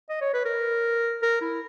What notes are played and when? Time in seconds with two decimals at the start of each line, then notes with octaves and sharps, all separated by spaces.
0.10 D#5
0.21 C#5
0.34 B4
0.45 A#4
1.22 A#4
1.41 E4